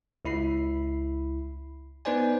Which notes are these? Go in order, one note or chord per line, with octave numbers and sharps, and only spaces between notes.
C#2 E4 B5 C7
B3 D#4 B4 C5 D5 G#5